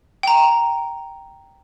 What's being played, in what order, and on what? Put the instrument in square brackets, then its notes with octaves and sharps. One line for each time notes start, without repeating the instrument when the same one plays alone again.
[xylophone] G5 A#5